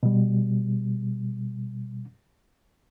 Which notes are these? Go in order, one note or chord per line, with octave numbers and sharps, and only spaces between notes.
B2 G3